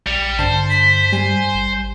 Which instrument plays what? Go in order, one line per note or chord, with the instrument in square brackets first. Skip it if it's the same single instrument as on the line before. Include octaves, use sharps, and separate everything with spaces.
[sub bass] A#1 [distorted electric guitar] G3 [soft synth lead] C#7
[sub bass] G2 [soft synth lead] D3 [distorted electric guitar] C5 [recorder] A5
[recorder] B6
[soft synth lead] G3 [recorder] G#5
[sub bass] G#1